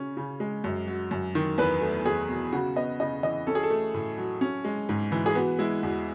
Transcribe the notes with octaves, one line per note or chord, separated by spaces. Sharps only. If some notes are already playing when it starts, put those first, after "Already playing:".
Already playing: C#3 C#4
C#3
G#3
F#2
F#3
F#2
D#3
E2 B4
A3
E2 G#4
B2
C#3 F#4
B3 D#5
C#3 D#5
E3 D#5
C#4 A4
G#4
A4
A3
A2
F#3
C#4
G#3
G#2
E3
G#4
B3 F#4
G#3 E4
E2 F#4